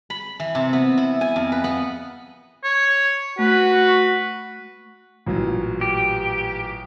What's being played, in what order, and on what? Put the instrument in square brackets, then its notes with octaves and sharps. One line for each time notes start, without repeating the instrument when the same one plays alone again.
[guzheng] B5
E3
C3
B3
E4
G#5
F2
B4
B3
[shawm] C#5
[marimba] A3 [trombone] F#4 [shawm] B4
[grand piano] A1 A#2 F#3
[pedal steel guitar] G4